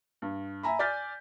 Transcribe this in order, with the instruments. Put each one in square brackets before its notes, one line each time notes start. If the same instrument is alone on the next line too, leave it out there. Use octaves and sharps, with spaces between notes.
[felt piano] G2
E5 G#5 A#5 B5
D5 G#5 F6 G6 A6 B6